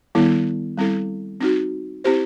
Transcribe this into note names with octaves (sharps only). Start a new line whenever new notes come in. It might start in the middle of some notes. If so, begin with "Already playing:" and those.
D#3 G3 B3 E4 A4
G3 C4 E4 A4
C4 D#4 F#4
C4 E4 G4 C5